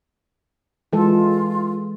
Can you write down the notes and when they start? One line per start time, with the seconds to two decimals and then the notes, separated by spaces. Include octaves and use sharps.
0.93 E3 G#3 F4 A4